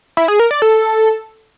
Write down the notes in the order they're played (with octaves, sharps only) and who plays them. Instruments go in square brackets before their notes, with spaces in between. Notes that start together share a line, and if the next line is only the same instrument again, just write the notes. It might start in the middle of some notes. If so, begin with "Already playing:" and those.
[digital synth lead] E4
G#4
A#4
D5
A4